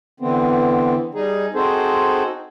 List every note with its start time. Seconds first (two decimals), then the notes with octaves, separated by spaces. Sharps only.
0.20 D3 E3 B3 C4
1.14 G3 D#4 G#4
1.54 C4 D#4 F#4 G#4 A4 C5